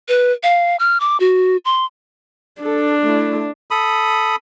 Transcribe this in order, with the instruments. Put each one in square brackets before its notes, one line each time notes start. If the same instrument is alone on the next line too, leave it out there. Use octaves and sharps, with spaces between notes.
[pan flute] B4
F5
F6
D6
F#4
C6
[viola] D4 [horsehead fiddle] A4
[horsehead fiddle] A3 E4
[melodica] A4 B5 D#6